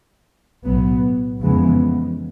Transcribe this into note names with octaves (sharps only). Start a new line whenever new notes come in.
B1 A2 F#3 B3
F2 C#3 E3 G#3 B3